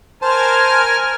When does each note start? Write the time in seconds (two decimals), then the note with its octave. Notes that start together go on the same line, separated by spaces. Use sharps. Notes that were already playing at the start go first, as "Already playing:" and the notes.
0.22 A#4 C5 G#5 A5 F6